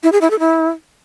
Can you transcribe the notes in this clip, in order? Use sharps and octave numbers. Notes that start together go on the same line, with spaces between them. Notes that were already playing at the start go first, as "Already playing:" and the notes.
E4
G#4
E4
A4
E4